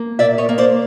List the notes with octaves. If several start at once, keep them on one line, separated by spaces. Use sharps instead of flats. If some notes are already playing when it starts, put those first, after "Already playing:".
Already playing: A#3
A#2 D5 E5
C#5 D#5
A#3
C5 D5